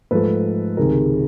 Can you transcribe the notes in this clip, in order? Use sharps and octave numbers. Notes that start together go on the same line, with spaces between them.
G#2 F3 A3 A4 B4
C#2 C3 D#3 G#3 G#4 A#4